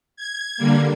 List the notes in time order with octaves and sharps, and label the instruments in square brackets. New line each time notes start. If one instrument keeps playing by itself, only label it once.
[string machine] G#6
D3 G3 A#3